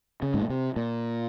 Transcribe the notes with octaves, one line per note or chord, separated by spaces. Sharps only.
C#3
G#2
A#2
C3
A#2